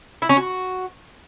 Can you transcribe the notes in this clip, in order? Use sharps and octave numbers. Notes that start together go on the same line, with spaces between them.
E4
C#4
F#4